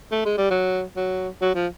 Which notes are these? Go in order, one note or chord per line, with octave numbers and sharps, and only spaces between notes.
A3
G#3
G3
F#3
F#3
F#3
F3